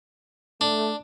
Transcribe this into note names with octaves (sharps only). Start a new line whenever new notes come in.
A3 D4